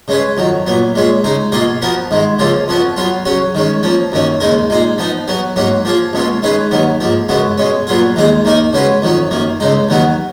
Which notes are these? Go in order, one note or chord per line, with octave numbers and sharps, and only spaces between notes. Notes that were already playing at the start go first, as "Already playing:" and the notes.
C#3 G#3 C#4 G#4 B4
F2 D#3 F#3
A#2 F#3 B3
A#2 G#3 C#4 G#4
C#3 G#3 D#4
B2 A#3 F4 G#4 D#5
F3 B3 F#4 A#4
G#2 D#3 G#3
C#2 C#3 F3 A#3 F4
F2 F3 B3 F#4
F#3 B3 F4
C#3 F#3 C#4 F#4
D#3 G#3 C#4
F3 A#3 C#4
F#2 D#3 A#3 C#4
D#2 C#3 G#3 D#4 A#4
A#2 G#3 D#4 G#4
F3 B3 D#4
F#3 B3 F#4
G#2 F#3 A#3 C#4 F#4
F3 A#3 F4 G#4
C#2 B2 A#3 C#4 F4
D#3 G#3 C#4 G#4 B4
D#2 D#3 F#3 B3
G#2 F3 A#3
F#2 C#3 G#3 B3 F#4
B2 G#3 C#4
A#2 F#3 B3 F4 G#4
D#2 D#3 G#3 D#4 G#4
D#2 D#3 A#3 D#4 A#4
C#3 G#3 C#4 F#4 B4
F2 D#3 F#3 C#4
F#2 D#3 A#3
C#2 C#3 G#3 D#4
D#2 D#3 F#3 B3 F#4